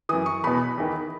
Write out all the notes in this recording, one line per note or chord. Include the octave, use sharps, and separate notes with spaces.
F#2 E3 D#6
C#6
E2 B2 B5
E2 D#3